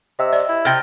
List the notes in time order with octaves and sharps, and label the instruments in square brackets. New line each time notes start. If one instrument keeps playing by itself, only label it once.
[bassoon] C3 [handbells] D#5 E5 E6
[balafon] D5
[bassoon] E4
[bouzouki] C3 G5 [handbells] F6 A6 A#6